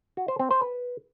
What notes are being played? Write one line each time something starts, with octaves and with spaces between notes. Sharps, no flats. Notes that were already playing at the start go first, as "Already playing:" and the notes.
F#4
C5
C4
C5
B4